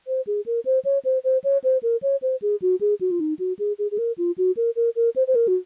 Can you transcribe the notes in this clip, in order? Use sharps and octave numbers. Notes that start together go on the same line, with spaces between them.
C5
G#4
A#4
C5
C#5
C5
C5
C#5
C5
A#4
C#5
C5
G#4
F#4
G#4
F#4
F4
D#4
F#4
G#4
G#4
G#4
A#4
F4
F#4
A#4
A#4
A#4
C5
C5
A#4
F#4